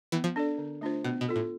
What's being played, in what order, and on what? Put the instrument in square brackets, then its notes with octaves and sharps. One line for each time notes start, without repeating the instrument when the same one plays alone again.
[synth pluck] E3 [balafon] B3
[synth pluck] F3
[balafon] D4 A4 D5
D3
A3 D4 F4 C5
[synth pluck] B2 [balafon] B3
[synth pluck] B2
[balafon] F4 A4
[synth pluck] A2